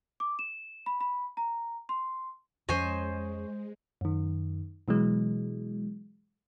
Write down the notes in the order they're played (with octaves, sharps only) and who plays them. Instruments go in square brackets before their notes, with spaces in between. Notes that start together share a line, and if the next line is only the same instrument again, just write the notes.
[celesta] D6
E7
B5
B5
A#5
C6
[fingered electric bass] F2 F3 C#4 [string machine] G#3 [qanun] C5 D#5 [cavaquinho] C#5 G#5
[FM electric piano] F#2 D#3
B2 E3 F#3 G#3